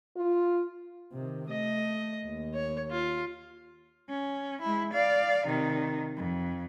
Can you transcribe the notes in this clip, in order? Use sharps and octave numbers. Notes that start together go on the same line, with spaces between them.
F4
C3 D#3
A3 D#5
D#2
C#5
F4
C#4
G#3 E4
D5 F5
C3 D#3
F2